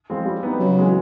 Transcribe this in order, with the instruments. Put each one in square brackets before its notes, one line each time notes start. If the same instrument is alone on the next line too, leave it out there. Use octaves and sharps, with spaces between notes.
[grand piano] F3 G#3 C4
G3
B3 D#4 G4
[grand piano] C#3 [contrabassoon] F#3
[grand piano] E3 G#3 B3